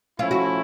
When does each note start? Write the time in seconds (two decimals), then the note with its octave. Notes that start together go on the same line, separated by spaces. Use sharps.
0.19 F3 A3 C#4 E4 F4
0.31 F#4